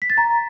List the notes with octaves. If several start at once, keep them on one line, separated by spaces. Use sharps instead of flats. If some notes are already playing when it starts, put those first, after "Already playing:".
B6
A6
A#5